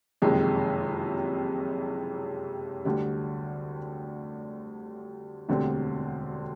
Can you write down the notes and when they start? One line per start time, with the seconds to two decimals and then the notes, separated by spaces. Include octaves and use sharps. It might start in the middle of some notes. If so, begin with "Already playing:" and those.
0.22 F#1 F2 C3 D#3 G#3
2.85 D2 D3 G3
5.49 E1 D2 D3 G3 C4